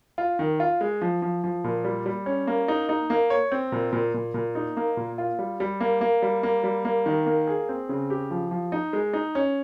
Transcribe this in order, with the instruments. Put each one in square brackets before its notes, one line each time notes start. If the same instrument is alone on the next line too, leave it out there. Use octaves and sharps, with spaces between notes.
[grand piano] F4
D#3
F4
G#3
F3
F3
F3
A#2
G3
G3
C#4
A#3
D#4
D#4
A#3
C#5
C4
A#2
A#2
A#2
A#2
D#4
A#3
A#2
F4
G3
G3
A#3
A#3
G3
A#3
G3
A#3
D#3
A#3
G#4
C4
C#3
G4
F3
F3
D#4
G#3
D#4
C#4